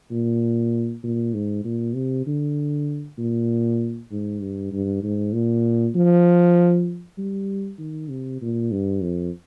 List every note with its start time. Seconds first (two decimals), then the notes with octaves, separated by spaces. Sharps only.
0.11 A#2
1.03 A#2
1.34 G#2
1.64 A#2
1.95 C3
2.26 D3
3.18 A#2
4.11 G#2
4.41 G2
4.72 G2
5.03 G#2
5.33 A#2
5.95 F3
7.18 G3
7.79 D#3
8.10 C3
8.42 A#2
8.72 G2
9.03 F2